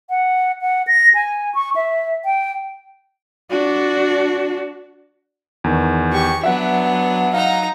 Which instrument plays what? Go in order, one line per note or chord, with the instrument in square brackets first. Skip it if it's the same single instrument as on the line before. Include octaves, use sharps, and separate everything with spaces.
[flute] F#5
F#5
A#6
G#5
C#6
E5
G5
[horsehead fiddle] D4 F#4
[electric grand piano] E2 D#3
[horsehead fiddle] G4 [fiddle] C#6
[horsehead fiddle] F#3 [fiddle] B3 D4 [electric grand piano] E5 F#5
[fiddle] D#4 A#5 [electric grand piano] F5 F#5